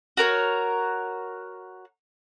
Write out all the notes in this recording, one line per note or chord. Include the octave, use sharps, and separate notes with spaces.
F#4 A#4 C#5